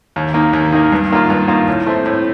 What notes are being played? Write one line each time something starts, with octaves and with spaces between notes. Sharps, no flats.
D#2
D#3 A#3
D#2
D#3 A#3
G2
D#3 A#3 F4
G2
D#3 A#3 F4
A2
A3 C4
A2